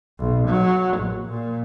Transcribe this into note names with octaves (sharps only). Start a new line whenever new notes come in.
B1
F#3
A#1
A#2